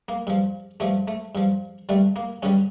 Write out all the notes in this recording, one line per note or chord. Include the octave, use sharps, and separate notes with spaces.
A#3
G2 F3
G2 F3 A3
A3
G2 F3
G2 D3 G3 A3
A#3
G2 D3 G3 C#4